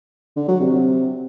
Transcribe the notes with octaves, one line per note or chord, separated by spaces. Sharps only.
D3
F#3
C3